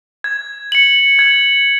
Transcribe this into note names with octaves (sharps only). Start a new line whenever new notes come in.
G#6
C#7 F#7
G#6